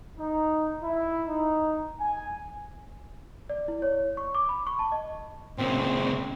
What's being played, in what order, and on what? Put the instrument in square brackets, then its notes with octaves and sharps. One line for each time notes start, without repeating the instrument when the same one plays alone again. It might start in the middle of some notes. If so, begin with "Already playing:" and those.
[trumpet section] D#4
E4
D#4
G#5
[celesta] D5
E4
C#5
C#6
D6
B5
C#6
A5
D#5
[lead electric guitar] A#2 C#3 [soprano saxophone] C4